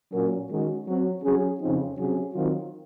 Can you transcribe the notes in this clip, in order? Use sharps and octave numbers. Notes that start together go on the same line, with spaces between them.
A#2 F#3 C#4 F#4 A#4
D#3 G#3 C#4 F#4
F#3 C4 F#4
F#3 C#4 G#4
F2 C#3 F3 C4 D#4
C3 F#3 C#4 G#4
D#3 F#3 C4 F4